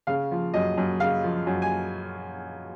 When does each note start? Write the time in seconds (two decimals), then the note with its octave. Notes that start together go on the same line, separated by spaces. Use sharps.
0.07 C#3 F5
0.31 F3
0.54 F#2 D#5
0.77 F#2
1.00 C#3 F5
1.24 F3
1.47 F#2
1.62 G#5